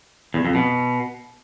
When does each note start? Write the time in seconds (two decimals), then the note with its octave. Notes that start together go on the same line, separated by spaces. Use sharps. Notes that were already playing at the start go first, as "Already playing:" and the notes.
0.34 E2
0.45 F2
0.55 B2